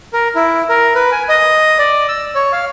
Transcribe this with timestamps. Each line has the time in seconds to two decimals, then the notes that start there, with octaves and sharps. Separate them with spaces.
0.13 A#4
0.35 E4
0.69 A#4
0.95 B4
1.12 G#5
1.29 D#5
1.79 D5
2.08 E6
2.35 C#5
2.53 F5